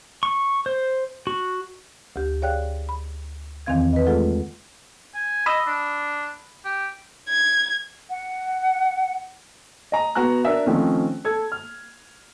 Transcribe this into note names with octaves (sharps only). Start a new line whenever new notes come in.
C#6
C5
F#4
D2 G4
G#4 C#5 D5 F5 G5 F#6
B5
E2 D#3 E3 C4 F5 G#6
B4 D#5
G#3 A3 F4 G#4 A4 F#5
G#5
D#5 B5 D#6 E6
D4
G4
G#6
F#5
D#5 A#5
B3 F#4 A#5 F#6
D4 A#4 E5
D#3 F3 A3 C4 C#4
A4 G#6
F6